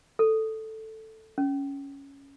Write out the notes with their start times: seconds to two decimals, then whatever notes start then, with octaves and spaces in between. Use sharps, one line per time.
0.19 A4
1.38 C#4